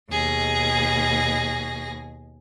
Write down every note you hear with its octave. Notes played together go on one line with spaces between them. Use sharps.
D#2 B2 G#4 A#6